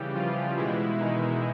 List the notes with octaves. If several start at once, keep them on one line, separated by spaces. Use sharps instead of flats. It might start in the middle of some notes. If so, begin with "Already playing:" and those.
Already playing: C#3 E3 G3 G4
F3 F4
B2 E3 G#3 E4
D#3 D#4